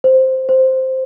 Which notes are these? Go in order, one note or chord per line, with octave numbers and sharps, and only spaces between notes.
C5
C5